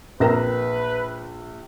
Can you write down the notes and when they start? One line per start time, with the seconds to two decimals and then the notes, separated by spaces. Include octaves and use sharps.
0.20 A#1 C4 A#4 B4 A#5 A#6